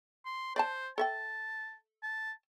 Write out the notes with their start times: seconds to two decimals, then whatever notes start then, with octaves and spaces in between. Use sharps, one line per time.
0.25 C6
0.56 C5 D5 D#5 A5
0.98 A4 E5 G5 A5
2.03 A5